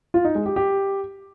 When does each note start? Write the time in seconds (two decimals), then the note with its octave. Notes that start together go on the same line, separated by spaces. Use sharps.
0.14 F4
0.25 D#4
0.35 G#3
0.46 G4
0.56 G4